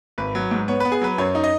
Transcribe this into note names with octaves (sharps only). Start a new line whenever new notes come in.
G#1 B4
F#3
G#2
B3 C#5
B3 B4
G#4
F#3 B4
F#2 C#5
D#4
D#5